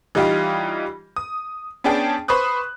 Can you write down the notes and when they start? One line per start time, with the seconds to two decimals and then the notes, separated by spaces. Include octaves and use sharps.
0.15 E3 G3 D#4 F4 G4
1.16 D#6
1.84 B3 C#4 D4 G#4 G5 A5
2.28 B4 C5 B5 C#6 D#6 F#6